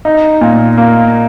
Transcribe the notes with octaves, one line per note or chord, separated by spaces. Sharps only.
D#4
A#2
A#3